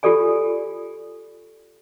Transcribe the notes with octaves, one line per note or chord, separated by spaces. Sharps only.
F4 G4 A4 D5 G#5